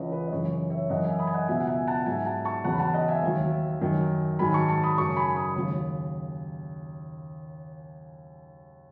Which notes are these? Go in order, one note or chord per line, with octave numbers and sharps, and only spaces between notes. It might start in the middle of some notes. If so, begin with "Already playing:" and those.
Already playing: C#2 C#3 E3 B4 C#5 D#5
B4
D#5
F#2 C#3 E3 C#5
C#5
C#5 E5
F#2 E3 D#5 F#5
E5 G#5
B5 D#6
G#5
D#5 F#5
C#2 B2 F#3 E5 G#5
F#5
E5 G#5
F#5 A5
G#2 F#3 E5 G#5
F#5 A5
A5 C#6
E2 C#3 F#3 F#5 A5
B5
F#5 A5
D#5 F#5
E5 G#5
D#2 D#3 F#3
F#2 D#3 F#3
G#2 D#3 F#3 G#5 B5
A5 C#6
A5 C#6
B5 D#6
F#2 C#3 F#3 A5 C#6
G#5 B5
B5 D#6
D#2 C#3 F#3